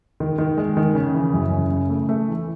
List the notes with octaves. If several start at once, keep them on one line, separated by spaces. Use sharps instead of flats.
D#3
D#3
G#3
D#3
C#3
E3
F#2
C#3
C#3
A3
A3
E3